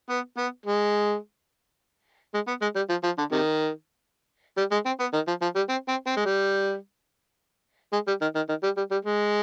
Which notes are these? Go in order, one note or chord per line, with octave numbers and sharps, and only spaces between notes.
B3
B3
G#3
G#3
B3
G#3
G3
F3
F3
D3
C3 D#3
G3
G#3
C4
B3
D#3
F3
F3
G3
C4
C4
C4
G#3
G3
G#3
G3
D#3
D#3
D#3
G3
G3
G3
G#3